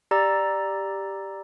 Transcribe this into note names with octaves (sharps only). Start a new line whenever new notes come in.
G4 D5 A#5 E6 A6